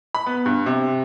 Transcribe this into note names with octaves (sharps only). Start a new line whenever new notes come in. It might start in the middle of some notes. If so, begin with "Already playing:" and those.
B5
B3
G2
C3